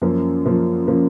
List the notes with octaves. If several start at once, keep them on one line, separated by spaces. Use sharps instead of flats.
F#2 F3 A#3 C#4
F#2 F3 A#3 C#4
F3 A#3 C#4